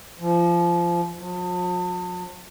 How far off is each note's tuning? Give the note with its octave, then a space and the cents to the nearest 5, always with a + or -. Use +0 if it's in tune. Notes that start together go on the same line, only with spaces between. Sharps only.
F3 -20
F3 +45